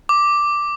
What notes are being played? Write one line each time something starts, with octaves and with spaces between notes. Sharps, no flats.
D6